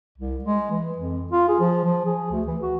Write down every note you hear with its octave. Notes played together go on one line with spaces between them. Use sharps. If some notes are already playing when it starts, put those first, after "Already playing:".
C2
G#3
E3
F2
F4
G#4
F3
F3
G#4
D2
E3
F#4